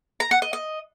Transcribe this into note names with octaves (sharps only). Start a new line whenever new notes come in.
A#5
F#5
D#5
D#5